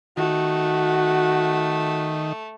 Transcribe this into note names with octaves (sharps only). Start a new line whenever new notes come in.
D#3 A3 F#4